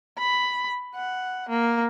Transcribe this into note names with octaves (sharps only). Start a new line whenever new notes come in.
B5
F#5
A#3